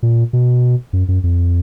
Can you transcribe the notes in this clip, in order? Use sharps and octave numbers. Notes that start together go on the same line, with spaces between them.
A#2
B2
F#2
F#2
F2